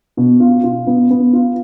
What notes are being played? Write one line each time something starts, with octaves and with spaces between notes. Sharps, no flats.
B2
F4
F4
B3
B3
F4